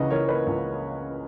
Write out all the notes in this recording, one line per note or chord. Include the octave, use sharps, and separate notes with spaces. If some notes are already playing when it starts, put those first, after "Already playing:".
Already playing: C#2 C#3 E3 B4 D#5 F#5 A#5 C#6
E3 A#4 C#5
A#3 B4 D#5
C#2